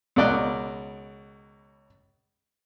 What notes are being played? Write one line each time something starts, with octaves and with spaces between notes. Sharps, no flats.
C#2 B2 A#4 D5 D#5 F#6